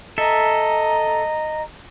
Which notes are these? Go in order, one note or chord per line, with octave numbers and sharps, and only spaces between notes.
A4 D#5 E5 A#5